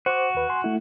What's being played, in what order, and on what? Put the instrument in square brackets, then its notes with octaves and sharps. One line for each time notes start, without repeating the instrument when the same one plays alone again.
[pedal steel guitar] F#4 [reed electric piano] C5 D6
[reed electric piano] D#2 B4
G#5 C6
A3 E4